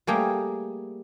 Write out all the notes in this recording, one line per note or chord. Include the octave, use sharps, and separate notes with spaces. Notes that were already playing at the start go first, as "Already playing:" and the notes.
G3 A3 A#3 G4 G#4